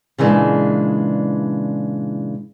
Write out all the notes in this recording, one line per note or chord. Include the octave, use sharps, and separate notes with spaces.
A#2 C#3 E3 G#3 D4